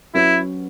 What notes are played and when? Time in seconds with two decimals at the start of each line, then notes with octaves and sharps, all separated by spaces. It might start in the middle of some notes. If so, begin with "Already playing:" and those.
0.14 F#3 C#4 E4 F#4 B4